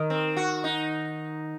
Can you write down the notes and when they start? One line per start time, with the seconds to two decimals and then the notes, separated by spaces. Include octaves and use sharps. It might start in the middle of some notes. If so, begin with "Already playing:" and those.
Already playing: D#3
0.10 C4
0.37 F#4
0.64 D#4